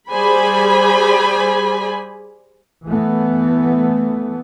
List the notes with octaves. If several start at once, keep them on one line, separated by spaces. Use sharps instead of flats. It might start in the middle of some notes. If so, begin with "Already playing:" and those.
G3 G#4 C5 D5 G#5 B5
E3 A3 B3